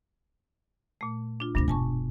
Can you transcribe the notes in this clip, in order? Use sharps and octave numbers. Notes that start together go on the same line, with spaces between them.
A#2 A3
D4 F4
D2 G2 C3 D4 A#6
E1 G#5 A5 C#6